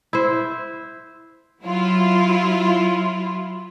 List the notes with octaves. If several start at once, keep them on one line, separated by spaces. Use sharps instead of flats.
E4 C5
F#3 E4 F4